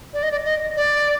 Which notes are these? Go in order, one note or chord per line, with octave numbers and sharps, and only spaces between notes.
D5
D#5
D5
D#5
D5